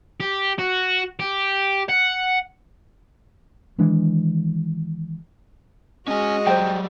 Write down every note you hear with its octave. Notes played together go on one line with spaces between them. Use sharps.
G4
F#4
G4
F#5
D#3 E3 G#3 D4
G#3 C#4 F#4 D#5 G#5
F#3 G3 C5 G5